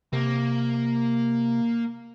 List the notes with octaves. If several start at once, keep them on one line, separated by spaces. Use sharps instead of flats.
C3 A#3